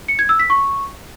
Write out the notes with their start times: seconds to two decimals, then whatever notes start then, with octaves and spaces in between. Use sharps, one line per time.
0.08 C#7
0.19 G#6
0.29 E6
0.39 B6
0.50 C#6